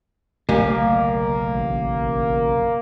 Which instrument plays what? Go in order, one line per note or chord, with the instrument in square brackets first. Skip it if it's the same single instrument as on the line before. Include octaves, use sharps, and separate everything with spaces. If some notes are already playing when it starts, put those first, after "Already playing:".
[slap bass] F#1 B1 D3 [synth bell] A3 [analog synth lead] A#3
[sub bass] A1